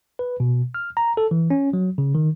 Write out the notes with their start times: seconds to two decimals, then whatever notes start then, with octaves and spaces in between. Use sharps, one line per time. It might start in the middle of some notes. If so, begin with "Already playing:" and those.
0.19 B4
0.40 B2
0.74 F6
0.97 A#5
1.17 A4
1.31 E3
1.50 C#4
1.73 F#3
1.98 C#3
2.15 D#3